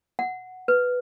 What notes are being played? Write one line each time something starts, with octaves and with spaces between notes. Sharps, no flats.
F#5
B4